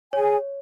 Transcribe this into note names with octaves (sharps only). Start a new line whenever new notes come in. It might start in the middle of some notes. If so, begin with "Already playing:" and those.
G#4 C#5 G#5